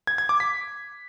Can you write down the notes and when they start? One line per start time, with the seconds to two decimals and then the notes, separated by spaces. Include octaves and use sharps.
0.07 G#6
0.18 G#6
0.29 D6
0.40 B6